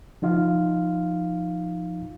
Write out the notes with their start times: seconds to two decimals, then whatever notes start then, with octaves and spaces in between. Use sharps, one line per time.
0.22 F3 D#4 F4 F5